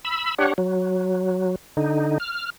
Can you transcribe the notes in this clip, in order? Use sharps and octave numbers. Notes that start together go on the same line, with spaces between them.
B5 E6
D4 G4 C#5 F#5
F#3
D3 D#4
F6